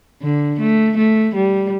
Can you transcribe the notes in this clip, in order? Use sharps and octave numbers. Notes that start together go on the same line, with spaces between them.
D3
A3
A3
G3